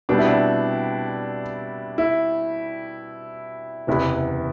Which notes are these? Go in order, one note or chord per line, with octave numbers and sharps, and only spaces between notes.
B2 G3 C4 D4
E4
D4
E4
F#1 E2 C3 E3 B3 E4